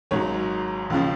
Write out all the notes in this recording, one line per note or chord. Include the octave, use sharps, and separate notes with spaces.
G#1 G#2 F#3 C#5
D#2 C#3 F3